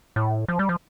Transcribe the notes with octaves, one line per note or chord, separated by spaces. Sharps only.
A2
F3
G3
F3